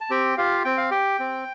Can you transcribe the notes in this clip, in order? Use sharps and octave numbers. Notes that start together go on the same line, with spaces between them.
A5
C4 G4 G5
F4 G4 F5
C4 G5
F5
G4 G5
C4